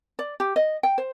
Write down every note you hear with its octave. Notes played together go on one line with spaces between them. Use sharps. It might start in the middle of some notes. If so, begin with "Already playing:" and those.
D5
G4
D#5
G5
C5